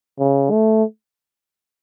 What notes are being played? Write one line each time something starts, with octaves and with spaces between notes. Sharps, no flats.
C#3
A3